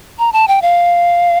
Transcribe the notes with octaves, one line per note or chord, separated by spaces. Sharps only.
A#5
A5
G5
F5